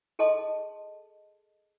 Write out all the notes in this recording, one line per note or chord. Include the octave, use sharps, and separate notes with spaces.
G#4 A4 D#5 A5 C6